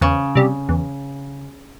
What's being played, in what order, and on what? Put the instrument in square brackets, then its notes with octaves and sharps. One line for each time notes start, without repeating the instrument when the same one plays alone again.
[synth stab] E2 [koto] C#3
[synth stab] C3 G3
E2